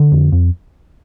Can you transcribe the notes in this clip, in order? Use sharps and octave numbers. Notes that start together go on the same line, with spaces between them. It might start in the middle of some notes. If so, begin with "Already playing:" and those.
Already playing: D3
F2
F2